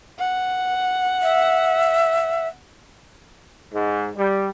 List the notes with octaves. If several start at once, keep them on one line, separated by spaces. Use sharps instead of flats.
F#5
E5
G#2
G3